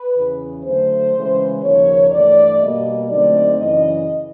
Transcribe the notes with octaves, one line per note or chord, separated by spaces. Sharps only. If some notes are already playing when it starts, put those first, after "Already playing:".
Already playing: B4
E2 C#3 E3
D3 F#3 A3 C5
C#3 E3 G#3
D#2 C#3 F3 A#3 C#5
G2 E3 A3 D5
B2 G3 A#3 D#5
D3 F#3 A3 C4 D#4 D5
F#2 C#3 E3 D#5